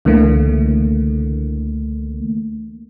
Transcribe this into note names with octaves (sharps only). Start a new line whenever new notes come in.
C#2 D3 E3 A3 A#3